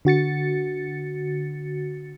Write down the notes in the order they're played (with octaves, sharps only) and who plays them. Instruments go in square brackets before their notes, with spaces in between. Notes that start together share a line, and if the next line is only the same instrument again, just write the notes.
[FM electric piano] D3 F#4 A6 C#7